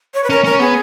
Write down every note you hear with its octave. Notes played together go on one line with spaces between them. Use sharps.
C#5
B4
C#4 A#4
C#4 A#4
B3 G#4